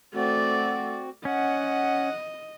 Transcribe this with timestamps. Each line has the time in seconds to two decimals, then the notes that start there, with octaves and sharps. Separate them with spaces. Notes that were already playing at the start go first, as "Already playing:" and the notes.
0.15 A3 C4 F#4 D5
1.25 C#4 D#5 F#5